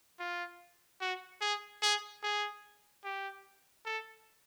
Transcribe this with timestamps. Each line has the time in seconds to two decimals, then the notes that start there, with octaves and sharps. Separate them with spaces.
0.20 F4
1.01 F#4
1.42 G#4
1.82 G#4
2.23 G#4
3.04 G4
3.86 A4